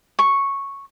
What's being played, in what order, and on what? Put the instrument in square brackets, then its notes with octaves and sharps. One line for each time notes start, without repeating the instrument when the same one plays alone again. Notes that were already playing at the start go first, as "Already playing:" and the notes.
[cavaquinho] C#6